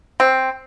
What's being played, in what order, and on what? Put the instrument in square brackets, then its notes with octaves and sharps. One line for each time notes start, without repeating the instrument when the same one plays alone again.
[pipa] C4